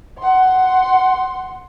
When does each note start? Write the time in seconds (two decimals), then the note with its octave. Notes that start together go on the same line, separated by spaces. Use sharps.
0.19 F#5 C6